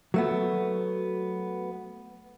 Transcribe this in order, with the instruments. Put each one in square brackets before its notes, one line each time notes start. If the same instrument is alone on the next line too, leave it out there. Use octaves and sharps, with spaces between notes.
[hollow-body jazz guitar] F#3 A3 B3